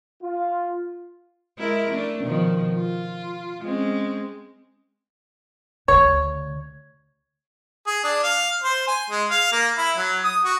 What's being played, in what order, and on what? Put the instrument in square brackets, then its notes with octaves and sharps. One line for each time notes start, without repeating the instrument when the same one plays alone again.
[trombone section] F4
[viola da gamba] G#3 E4 A#4
A3 D4
B2 D#3 F3
F4
G#3 C4 C#4
[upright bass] D2 C#3 [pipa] C#5
[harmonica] G#4
D4
F5
C5
G#5
G#3
F5
A#3
E4
F#3
D#6
F#4